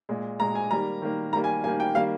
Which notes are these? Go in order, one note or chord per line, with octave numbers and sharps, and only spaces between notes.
A#2 G#3
A#2 G#3 A#5
G#5
D#3 G3 A#3 A#5
D#3 G3 A#3
D#3 G3 A#3 A#5
G#5
D#3 G3 A#3 G#5
G5
D#3 G3 A#3 F5